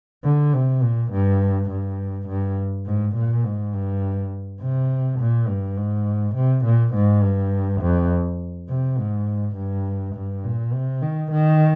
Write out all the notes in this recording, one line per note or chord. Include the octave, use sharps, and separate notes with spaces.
D3
C3
A#2
G2
G2
G2
G#2
A#2
G#2
G2
C3
A#2
G2
G#2
C3
A#2
G#2
G2
F2
C3
G#2
G2
G2
A#2
C3
D#3
D#3